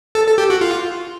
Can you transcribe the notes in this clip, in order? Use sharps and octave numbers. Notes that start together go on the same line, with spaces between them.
A4
A4
G4
F#4
F4